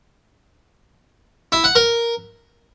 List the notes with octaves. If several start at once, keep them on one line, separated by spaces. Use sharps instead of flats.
E4
F#5
A#4